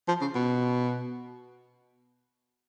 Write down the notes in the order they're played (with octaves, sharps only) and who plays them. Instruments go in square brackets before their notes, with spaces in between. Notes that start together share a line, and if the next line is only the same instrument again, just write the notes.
[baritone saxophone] F3
C#3
B2